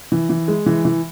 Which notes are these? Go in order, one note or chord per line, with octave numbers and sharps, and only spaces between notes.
E3
E3
G#3
E3
E3